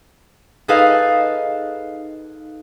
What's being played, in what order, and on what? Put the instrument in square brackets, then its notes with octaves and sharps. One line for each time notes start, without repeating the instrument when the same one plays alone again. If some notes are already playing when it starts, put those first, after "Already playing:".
[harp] D#4 G#4 A4 B4 D#5 F5